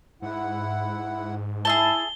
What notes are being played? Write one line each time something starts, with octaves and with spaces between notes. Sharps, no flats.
G#2 E4 F#5
E4 G#4 E5 A5 G7